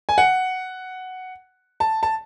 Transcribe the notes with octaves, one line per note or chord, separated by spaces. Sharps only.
G#5
F#5
A5
A5